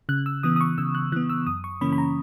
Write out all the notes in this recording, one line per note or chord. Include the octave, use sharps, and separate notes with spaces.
C#3 F#6
E6
E3 B3 D#6
D#6
C#6
C#3 E6
F#6
E3 B3 F#6
E6
F#2 D#6
C#6
C#3 E3 A#3 C#4 B5
B5
A#5